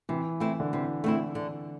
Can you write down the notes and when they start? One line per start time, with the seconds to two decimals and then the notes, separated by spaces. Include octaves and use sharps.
0.09 C3 E3
0.40 A3 C4 E4
0.60 D3
0.72 C3 E3
1.04 A3 C4 E4
1.35 D3